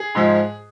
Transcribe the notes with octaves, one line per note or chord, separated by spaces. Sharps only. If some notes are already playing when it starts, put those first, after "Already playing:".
Already playing: G#4
G#2 F3 G#3